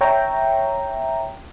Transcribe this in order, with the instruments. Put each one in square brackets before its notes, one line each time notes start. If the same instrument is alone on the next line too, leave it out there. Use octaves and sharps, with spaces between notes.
[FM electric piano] C#5 E5 G5 A#5